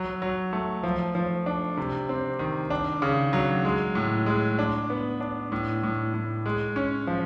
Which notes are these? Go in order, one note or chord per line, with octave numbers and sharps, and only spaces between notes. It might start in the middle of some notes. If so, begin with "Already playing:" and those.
Already playing: F#3
F#3
A3
F3
F3
D4
C3
C4
D#3
D4
C#3
F#3
G#3
A2
G#3
D4
B3
D4
A2
A2
A2
G#3
C#4
F3